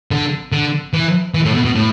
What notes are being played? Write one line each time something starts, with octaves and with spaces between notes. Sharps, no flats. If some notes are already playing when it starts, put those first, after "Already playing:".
D3
D3
E3
E3
A2
B2
B2
A2